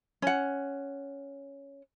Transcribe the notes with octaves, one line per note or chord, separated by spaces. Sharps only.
C#4 F#5